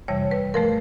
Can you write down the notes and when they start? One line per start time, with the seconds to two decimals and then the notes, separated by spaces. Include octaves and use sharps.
0.08 F2 C3 E3 G3 C#5
0.31 B4
0.54 G#2 F3 A3 A#4